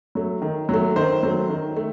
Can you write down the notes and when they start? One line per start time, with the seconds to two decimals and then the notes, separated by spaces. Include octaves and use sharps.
0.15 F#3 A3
0.42 D#3
0.69 F#3 A3
0.96 D#3 C5
1.23 F#3 A3
1.49 D#3
1.77 A3